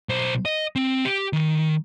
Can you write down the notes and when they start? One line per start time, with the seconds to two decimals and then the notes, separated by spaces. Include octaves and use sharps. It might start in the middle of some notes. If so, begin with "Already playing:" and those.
0.09 B1 C5
0.45 D#5
0.76 C4
1.05 G4
1.33 D#3